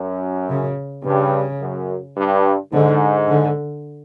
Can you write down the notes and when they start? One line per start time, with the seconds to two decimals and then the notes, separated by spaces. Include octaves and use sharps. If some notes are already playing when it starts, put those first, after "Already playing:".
Already playing: F#2
0.50 C#3
1.05 G2 C#3
1.61 F#2
2.16 G2
2.73 G#2 D3
3.29 D3